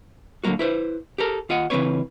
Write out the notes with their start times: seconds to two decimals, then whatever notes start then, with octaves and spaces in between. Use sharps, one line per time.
0.44 A2 D3 F#3 G#3 A#3 F#4
0.59 E4 B4 C5
1.18 G4 A4 A#4
1.49 D#2 F4 D#5 F#5
1.70 C#3 E3 A#3 C4 B4 C#5